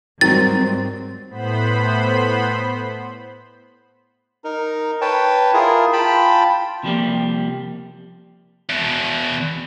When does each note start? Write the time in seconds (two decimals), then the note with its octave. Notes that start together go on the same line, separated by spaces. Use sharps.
0.21 G#2 D#3 F#3 G3 C4 A6
1.29 A2 B3 C5 B5
4.44 D#4 A#4
5.01 B4 C#5 G5 A5
5.54 E4 F4 G#4 A#4
5.93 F4 G5 A5 B5
6.83 C3 F3 G3 A#3
8.70 E2 B2